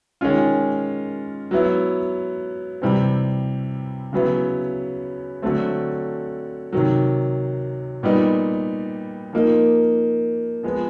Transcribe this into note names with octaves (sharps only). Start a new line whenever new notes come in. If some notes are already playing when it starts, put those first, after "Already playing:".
D#3 G#3 C#4 F4
F#3 B3 E4
C3 E3 G3 C4
C#3 F#3 B3 E4
D3 F#3 A3 C4
C3 D#3 F#3
A#2 G3 B3 D#4
F3 A#3 D#4
F3 G#3 B3